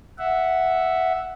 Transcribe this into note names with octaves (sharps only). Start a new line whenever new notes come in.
E5 F#5